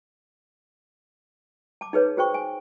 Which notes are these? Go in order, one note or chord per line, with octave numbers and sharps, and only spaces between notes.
A5 D6
D#4 G#4 B4 C#5
F#4 G#4 C5 G5 C#6
G#5